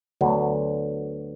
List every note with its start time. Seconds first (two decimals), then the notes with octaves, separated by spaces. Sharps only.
0.21 D2 D3 F#3 B3